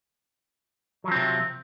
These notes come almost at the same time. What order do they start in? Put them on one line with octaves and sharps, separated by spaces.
F#3 F3 C4 C3